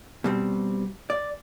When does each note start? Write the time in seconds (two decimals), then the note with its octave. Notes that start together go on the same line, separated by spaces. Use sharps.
0.24 B2 G3 C4
1.10 D5